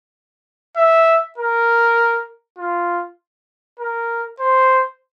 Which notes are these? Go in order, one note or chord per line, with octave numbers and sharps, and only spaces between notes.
E5
A#4
F4
A#4
C5